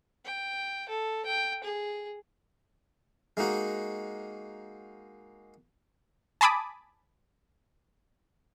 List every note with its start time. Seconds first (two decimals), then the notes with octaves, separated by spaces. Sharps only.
0.25 G5
0.89 A4
1.26 G5
1.64 G#4
3.37 G#3 A#3 D#4 F#4
6.41 G#5 A5 B5 D6 D#6